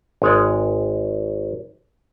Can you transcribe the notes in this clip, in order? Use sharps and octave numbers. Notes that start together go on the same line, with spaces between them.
G#1 G#3 C#5 D5